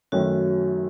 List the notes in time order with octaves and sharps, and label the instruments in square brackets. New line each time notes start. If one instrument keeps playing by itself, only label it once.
[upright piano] F#2 D#3 F#3 A3 C#4 [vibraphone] F#4